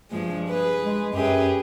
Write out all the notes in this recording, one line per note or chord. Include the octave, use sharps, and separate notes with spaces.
G2 F3 G#3
G#4 B4
G#3
F#2 G4 G#4 B4